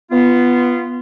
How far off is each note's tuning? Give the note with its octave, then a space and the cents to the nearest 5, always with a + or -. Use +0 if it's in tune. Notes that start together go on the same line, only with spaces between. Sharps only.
B3 +0 F4 -20